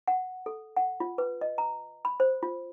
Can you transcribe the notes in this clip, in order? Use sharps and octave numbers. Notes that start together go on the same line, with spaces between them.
F#5
A4
F#5
F4
B4
D#5
A#5
B5
C5
F4